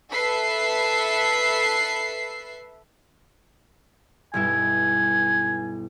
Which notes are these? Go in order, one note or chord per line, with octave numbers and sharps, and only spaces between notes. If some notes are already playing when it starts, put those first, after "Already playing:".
A4 B4 E5 C7
B1 G2 E4 G#5